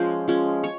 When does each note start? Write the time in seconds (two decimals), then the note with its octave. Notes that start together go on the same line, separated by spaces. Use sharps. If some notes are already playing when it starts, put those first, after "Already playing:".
Already playing: F3 G#3 C#4 C5 D#5
0.28 F3 G#3 C#4
0.64 C#5